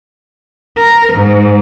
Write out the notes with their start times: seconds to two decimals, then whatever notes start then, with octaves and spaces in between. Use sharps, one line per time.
0.77 A#4
1.13 G#2